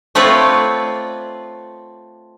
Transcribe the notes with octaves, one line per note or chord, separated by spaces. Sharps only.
A3 C4 F4 B4 C#5 D5